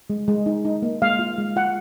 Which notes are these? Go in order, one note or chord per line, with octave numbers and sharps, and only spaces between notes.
G#3
G#3
D#4
D#4
A#3
G#3 F5
F4
G#3
F4 F#5